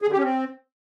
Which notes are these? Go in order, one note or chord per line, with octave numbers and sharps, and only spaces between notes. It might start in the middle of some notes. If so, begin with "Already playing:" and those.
G#4
D3
G4
C#4
C4